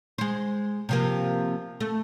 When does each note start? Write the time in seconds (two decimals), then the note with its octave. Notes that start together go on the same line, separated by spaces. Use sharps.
0.18 G#3 C5
0.89 C3 F3 A#3
1.80 A3